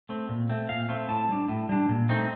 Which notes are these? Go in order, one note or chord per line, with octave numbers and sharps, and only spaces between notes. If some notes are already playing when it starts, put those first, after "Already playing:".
A3 C4
A#2
A3 C4
A#2 F5
A3 C4
A2 A5
G3 D4
A2
G3 D4
A#2
A3 C4 D#4